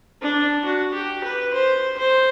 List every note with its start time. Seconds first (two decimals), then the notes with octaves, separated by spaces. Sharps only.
0.22 D4
0.65 F#4
0.94 G4
1.24 B4
1.54 C5
1.98 C5